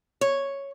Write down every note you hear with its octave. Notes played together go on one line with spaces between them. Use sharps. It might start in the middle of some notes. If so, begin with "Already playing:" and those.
C#5